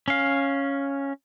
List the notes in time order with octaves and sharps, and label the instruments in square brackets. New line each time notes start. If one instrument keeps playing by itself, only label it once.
[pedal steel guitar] C#4 F5